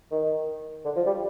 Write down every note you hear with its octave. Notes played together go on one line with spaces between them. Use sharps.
D#3
D3
F3
G3